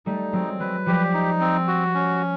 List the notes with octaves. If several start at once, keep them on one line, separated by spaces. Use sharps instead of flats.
G3 A3 D#4
F#3 G#3 C4
F#3 G#3 B4
F3 G3 G4
D#4
C4
F#4
C#4